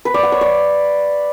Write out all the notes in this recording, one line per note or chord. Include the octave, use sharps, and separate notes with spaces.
B4
D5
F#5
C#5
D5